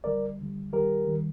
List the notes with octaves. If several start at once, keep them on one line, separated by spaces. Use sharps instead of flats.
D#2 D3 G3 A#4 D5
D#2 D3 G3
D#2 D#3 G3 G4 A#4
D#2 D#3 G3